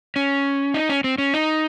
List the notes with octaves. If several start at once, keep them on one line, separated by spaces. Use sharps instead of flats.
C#4
D#4
C#4
C4
C#4
D#4